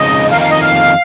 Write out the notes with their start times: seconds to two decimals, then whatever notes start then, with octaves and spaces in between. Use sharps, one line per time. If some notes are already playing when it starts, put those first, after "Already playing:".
Already playing: F2 C#3 G#3 D#4 D#5
0.30 F2 D#3 A#3 D#4 F5
0.41 F5
0.51 D#5
0.61 F5